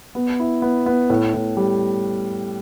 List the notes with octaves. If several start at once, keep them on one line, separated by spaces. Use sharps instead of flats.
B3
E4
B3
B3
A2
A2
G3